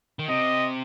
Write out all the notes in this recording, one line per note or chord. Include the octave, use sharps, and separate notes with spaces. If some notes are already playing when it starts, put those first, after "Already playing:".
D#3
C3 D#5